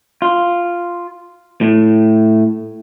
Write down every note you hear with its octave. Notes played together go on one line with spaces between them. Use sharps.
F4
A2